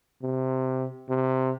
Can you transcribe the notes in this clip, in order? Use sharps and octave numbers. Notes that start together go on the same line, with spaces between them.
C3
C3